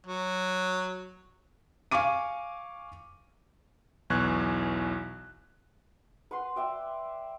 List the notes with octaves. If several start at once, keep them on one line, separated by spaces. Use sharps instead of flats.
F#3
F5 G#5 C#6 D6 D#7
B1 E2 E3 C#6 F#6 G#6
B4 F#5 C6
D5 E5 G5